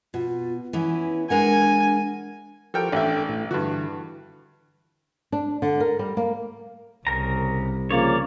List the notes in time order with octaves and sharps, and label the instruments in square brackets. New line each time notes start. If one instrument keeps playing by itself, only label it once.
[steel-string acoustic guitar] B2 [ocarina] F4
[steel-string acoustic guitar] E3 B3 C#4 [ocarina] E4
[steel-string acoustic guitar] G#3 A#4 F#5 [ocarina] D4 [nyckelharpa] G#5
[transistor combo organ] F3 F#4 G4 [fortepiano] A4 A#4 G5
[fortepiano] A1 E5 [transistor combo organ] D4 A4 G5
[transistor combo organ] A2
[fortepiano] G2 F#4 [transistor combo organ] D3 E3
[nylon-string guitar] D4
D3
A#4
G3
A#3
[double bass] C2 [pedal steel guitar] C#3 A#4 A#5
[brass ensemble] C#3 F3 A#3 [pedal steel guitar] C#5 D5